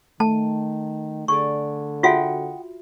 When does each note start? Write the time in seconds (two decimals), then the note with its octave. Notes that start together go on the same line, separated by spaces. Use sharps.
0.20 D#3 A3 A5
1.28 D3 G#4 D5 C#6
2.03 F4 F#4 G#4 E5 F#5 G5